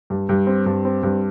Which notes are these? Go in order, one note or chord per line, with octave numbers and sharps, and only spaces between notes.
G2
G2
C4
G2
C4
G2